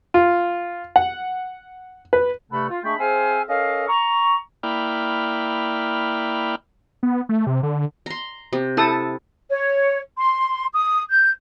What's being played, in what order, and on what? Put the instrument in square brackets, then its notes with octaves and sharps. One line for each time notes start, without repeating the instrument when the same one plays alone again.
[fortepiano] F4
F#5
B4
[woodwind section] G2 C3 A3 A4 F#5 B5
F4
G#3 A3 D4 G5 B5 C#6
C4 G#4 C5 E5 F5 G#5
C#4 A4 A#4 D#5 F5
A#5 C#6
[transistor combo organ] A#3 E4 D5 G5 B5 F6
[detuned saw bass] B3
A3
C3
D3
[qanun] A#5 C6
C3
[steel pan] E4 A4 D#6 [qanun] A5
[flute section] C#5
C6
D#6
G6